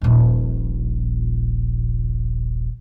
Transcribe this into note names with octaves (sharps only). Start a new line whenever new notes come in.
D#1 A#1